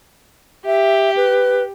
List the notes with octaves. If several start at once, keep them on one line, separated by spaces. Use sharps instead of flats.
G4 E5
B4